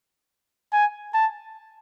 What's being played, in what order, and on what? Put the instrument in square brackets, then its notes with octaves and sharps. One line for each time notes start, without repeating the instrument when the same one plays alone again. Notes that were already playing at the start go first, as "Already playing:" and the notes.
[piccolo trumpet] G#5
A5